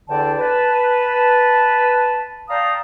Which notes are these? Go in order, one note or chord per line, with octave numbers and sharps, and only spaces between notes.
E2 D3 D4 D5 G5 A5
B4 A5
D5 F5 G5 A5 A#5 D#6